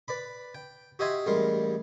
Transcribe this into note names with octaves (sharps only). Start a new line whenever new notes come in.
B4 D5 B5
G5
F#4 G4 D#5 E5 G#5 C6
A1 G3 G#3 A#4 C6